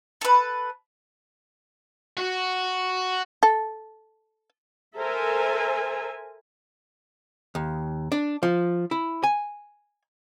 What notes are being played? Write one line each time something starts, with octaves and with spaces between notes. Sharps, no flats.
A4 B4
F#4
A4
A4 A#4 C5 E5 G#5
D#2
D4
F3
E4
G#5